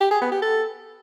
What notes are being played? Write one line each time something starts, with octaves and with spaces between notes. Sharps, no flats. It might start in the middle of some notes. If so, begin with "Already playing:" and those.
G4
G#4
B3
G4
A4